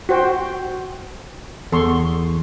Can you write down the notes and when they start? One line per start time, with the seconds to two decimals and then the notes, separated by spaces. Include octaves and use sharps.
0.09 F#4 C5 G5
1.72 E2 A4 C6 C#6